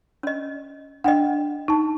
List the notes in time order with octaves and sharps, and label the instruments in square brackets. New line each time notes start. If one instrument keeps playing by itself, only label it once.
[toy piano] C#4 D#5
[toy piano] D4 D#5 [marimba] F#5 G5
[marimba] D#4 A5